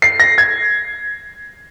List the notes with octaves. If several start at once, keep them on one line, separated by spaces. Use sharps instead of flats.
C7
A#6
G#6